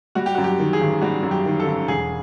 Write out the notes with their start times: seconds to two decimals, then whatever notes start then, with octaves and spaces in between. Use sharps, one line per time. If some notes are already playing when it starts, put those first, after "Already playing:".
0.15 G3 F#4
0.26 G4
0.35 F#4
0.38 F#2
0.44 G4
0.59 D#3
0.73 G#4
0.81 G#1
1.01 G3 F#4
1.23 F#2
1.31 G4
1.46 D#3
1.60 A4
1.66 G#1
1.88 E1 G#4